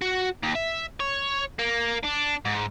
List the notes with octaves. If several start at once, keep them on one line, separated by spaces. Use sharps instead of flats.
F#4
D#2
E5
C#5
A#3
D4
G#2